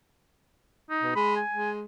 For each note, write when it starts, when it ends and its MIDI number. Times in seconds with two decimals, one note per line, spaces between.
0.90 1.13 63
1.03 1.15 47
1.15 1.40 56
1.15 1.35 83
1.36 1.71 80
1.53 1.85 56